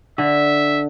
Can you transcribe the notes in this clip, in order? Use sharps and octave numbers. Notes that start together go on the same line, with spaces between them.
D3 E5